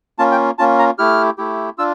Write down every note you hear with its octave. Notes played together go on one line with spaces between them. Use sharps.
A#3 C#4 F4 A5
G5
A#3 C#4 F4 A5
A#5
A3 E4 G4 F6
A3 E4 G4
D4 F4 E6